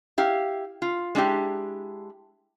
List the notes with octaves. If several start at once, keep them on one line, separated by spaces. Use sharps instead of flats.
E4 G4 F5
F4
G#3 D4 E4 G4